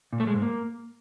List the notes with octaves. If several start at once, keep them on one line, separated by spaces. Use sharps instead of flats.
A#2
A3
G#3
G#2
A#3